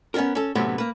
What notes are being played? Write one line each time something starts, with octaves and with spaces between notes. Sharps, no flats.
B3 C#4 D4 F#4 A#4
C#4 A4
F#2 A2 C3 F#3 B3 C#4
A#3 B4